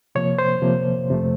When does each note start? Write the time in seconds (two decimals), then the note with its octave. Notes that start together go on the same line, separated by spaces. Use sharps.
0.15 C3 F3 A#3 C#5
0.39 C5
0.62 C3 F3 A#3
1.09 F2 C3 F3 A3